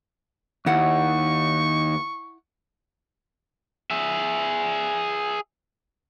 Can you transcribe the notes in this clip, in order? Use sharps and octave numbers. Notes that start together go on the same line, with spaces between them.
D#2 E4 F#5 C#6
G#4 E5